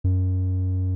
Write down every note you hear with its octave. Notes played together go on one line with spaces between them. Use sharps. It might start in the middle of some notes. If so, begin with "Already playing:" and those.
F#2